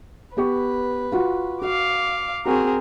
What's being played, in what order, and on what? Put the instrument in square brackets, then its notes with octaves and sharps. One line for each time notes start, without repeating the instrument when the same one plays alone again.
[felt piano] B3 G4 C#6 [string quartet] B4
[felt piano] F4 F#4
[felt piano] F#4 [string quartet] F5 D6
[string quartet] C4 G#4 A#4 [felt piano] F#4 C#6